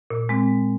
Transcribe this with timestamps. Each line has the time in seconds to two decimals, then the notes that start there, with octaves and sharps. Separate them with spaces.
0.10 A#2
0.29 G#3 C4